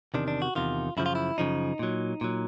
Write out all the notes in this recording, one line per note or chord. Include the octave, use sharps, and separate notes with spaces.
E2 C3 D#3 D4
D4
F#4
E2 C3 D#3 F4
F#2 C#3 F3 E4
F4
E4
F#2 C#3 F3 D#4
A#2 F#3
A#2 F#3